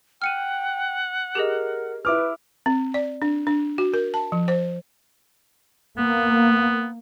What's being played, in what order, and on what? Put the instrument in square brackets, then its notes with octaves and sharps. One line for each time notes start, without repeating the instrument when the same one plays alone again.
[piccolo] F#5 [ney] G5 [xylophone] F6 C#7 D#7
[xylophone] G4 G#4 D#5 [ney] A#4
[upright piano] E4 D6 F6 [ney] B4
[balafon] C4
D5
D4
D4
F#4
A#4
A5
F3
C5
[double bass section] A#3 [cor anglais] B3